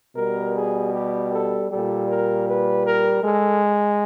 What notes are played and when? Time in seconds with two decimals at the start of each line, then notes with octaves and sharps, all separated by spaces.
0.16 B2 G3 A#4
0.54 G#4
0.93 G4
1.31 A4
1.69 G3 A4
1.74 A#2
2.08 A#4
2.46 B4
2.85 A#4
3.23 G#3 A4